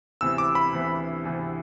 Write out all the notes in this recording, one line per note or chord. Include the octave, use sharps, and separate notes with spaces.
D2 C3 E3 B3 E4 E6
D6
B5
D2 C3 E3 B3 E4
D2 C3 E3 B3 E4